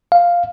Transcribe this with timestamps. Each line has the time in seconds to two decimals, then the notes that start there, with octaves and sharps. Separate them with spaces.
0.12 F5